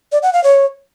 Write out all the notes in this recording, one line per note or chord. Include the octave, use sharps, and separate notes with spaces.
D5
F#5
F5
C#5